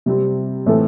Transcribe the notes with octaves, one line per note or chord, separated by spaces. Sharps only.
C3 G3 C4
A2 E3 A3 C4 A4